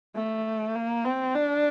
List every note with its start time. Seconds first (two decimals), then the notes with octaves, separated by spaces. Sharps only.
0.16 A3
0.75 A#3
1.05 C4
1.35 D4